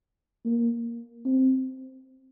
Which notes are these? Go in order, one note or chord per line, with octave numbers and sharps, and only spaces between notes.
A#3
C4